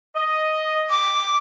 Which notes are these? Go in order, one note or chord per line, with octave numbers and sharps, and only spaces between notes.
D#5
D6